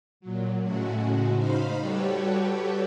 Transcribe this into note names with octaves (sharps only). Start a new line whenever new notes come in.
A#2 F#3
A2 C#3 G#3 A3 F#4
D#4 C5 F5 B5
G3 F#4 G4 A4 B4 C#5